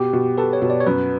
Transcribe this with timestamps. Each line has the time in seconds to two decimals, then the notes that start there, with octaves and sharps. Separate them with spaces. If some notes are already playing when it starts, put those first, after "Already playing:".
Already playing: B2 G4
0.13 B2
0.38 A4 B4
0.53 C#5
0.62 B2
0.70 D5
0.80 C#5
0.86 F#2 B4